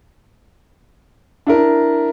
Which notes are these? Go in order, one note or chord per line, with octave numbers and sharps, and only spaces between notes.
D4 E4 A#4